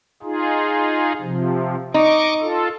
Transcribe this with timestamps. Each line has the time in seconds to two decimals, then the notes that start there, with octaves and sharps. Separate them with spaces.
0.23 D#4 F4 G#4
1.21 C3 F3
1.94 D#4 D#5 C#6 D6
2.41 F4 A4